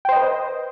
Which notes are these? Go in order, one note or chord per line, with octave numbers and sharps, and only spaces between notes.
B4 C5 D#5 G5